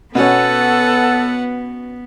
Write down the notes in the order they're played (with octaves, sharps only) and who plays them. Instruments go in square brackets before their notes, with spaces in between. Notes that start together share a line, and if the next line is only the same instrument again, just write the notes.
[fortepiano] B2 C#4 [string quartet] B3 [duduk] A4 [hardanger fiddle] B4 F#5